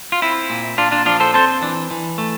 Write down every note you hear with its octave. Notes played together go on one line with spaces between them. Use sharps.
F4
C4 E4
A#2
A#2 D4 F4
D4 F4
F3 D4 F4
A4 C5
C4 A4 C5
E3 D4
E3
A3